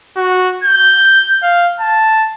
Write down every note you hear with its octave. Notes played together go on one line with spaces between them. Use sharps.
F#4
G6
F5
A5